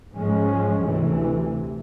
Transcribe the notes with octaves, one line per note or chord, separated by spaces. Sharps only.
G#2 F3 G#3 C#4
D2 C3 E3